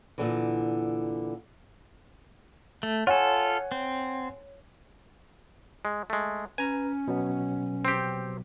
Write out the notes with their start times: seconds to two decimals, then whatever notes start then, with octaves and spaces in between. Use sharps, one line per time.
0.18 A#2 D3 E3
2.83 A3
3.07 F4 A4 C#5 F#5 G#5
3.72 C4
5.85 G#3
6.10 G#3 A3
6.58 C#4 B4 G#5 A#5
7.08 B2 F#3 B3
7.85 C4 G4